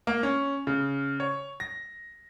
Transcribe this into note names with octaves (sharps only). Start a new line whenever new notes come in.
A#3
C#4
C#3
C#5
A#6